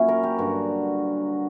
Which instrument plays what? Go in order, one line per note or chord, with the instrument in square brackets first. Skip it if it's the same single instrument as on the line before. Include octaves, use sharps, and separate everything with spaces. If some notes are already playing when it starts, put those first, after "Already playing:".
Already playing: [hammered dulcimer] A#2 F#3 C#4 E4
A#4
G4
G2 D3 F#3 F#4